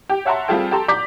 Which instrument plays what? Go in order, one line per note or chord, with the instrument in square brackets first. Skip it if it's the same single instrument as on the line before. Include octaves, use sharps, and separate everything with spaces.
[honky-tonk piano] G4
C#5 E5 F#5 A5 A#5 C6
G3 C4 F4 G#4 A4 G5
G4 A4 A5 A#5 C6
D5 A#5 D6 G6 B6